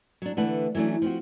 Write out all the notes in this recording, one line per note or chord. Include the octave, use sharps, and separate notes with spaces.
F#3 D4
D3 E3 A3 B4 F#5 A5
E3 F#3 A3 C#4 D4
F3 C4 F#4